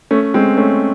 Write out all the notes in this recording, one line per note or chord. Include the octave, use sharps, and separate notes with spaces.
A3 C#4
G#3 C4
A3 C#4